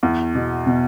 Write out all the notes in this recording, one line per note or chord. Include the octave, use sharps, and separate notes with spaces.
E2
B2
B2